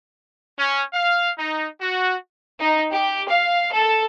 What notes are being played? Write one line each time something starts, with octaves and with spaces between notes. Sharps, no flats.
C#4
F5
D#4
F#4
D#4
G4
F5
A4